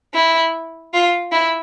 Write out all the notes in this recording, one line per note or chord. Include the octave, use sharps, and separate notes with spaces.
E4
F4
E4